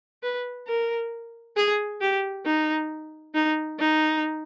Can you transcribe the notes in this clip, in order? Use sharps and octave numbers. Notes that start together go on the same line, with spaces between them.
B4
A#4
G#4
G4
D#4
D#4
D#4